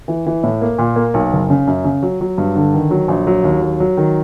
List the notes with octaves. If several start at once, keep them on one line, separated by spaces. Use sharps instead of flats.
E3
E3
A2
A#3
A#2
A#3
B1
F#1
C#3
F#2
C#3
F#3
F#3
G2
D3
D#3
F#3
A#1
F#3
D#2
F#3
F#3
D#3